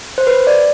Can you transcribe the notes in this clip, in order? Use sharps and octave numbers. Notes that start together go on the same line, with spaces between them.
C5
B4
D5